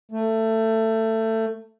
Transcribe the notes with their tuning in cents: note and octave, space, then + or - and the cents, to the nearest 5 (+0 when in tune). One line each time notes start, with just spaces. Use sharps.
A3 +20